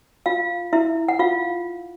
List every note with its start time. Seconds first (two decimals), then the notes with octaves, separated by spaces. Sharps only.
0.26 F4 F5
0.73 E4 E5
1.08 F#5
1.19 F4 F5